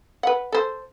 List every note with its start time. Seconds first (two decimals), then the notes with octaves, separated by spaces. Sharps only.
0.23 B4 F#5
0.52 A4 C5